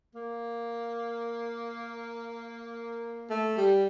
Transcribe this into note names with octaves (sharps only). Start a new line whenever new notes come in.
A#3
A3
G3